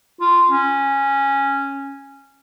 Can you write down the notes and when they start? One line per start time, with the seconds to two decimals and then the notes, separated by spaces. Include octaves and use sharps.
0.21 F4
0.50 C#4